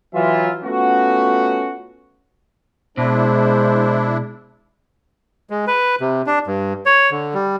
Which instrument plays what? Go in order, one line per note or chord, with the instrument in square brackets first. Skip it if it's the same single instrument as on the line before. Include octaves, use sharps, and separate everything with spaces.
[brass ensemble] E3 F#3 F4 E5
A3 B3 C#4 F4 F#4
[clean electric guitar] B2 [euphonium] G#3 [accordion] D4 E4 [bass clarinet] C5
[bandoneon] G#3
B4
C3
D4
G2
C#5
D3
G3